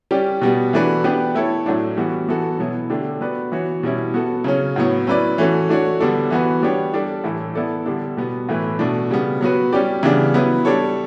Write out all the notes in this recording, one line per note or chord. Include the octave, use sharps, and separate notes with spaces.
G3 C#4 G4 D5
B2 G3 B3
E3 A3 D4 F#4 B4
B3 D4 G4 B4
A3 E4 A4 C#5
A2 F#3 A3 D4
E3 G3 B3 F#4
E3 B3 F#4 A4
B2 F#3 B3 E4
D3 A3 D4 G4
B3 F#4 B4 D5
E3 B3 F#4 C#5
B2 G3 C#4 E4
B3 F#4 A4
C#3 F#3 C#4
A2 F#3 B3
F#3 C#4 E4 B4 D5
E3 A3 C#4 F#4 A4
A3 D4 F#4 C#5
D3 G3 B3 D4 A4
E3 B3 F#4 B4
G3 B3 D4 G4 C#5
G3 D4 A4 D5
A2 E3 A3 E4 A4
B3 E4 A4 D5
D3 G3 B3 D4 A4
B2 G3 B3
A2 E3 A3 E4 B4
B2 A3 D4
C#3 G3 B3
F#3 B3 F#4 B4
G3 C#4 G4 D5
C#3 E3 G3 B3 D4
F#3 B3 E4 B4
G3 D4 A4 C#5